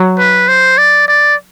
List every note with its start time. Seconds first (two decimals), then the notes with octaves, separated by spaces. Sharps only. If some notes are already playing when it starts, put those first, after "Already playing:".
Already playing: F#3
0.19 B4
0.48 C5
0.78 D5
1.08 D5